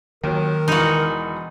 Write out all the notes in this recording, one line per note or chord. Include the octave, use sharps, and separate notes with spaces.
D#2 D#3 F#3 A#4
E1 E3 D#4 F#4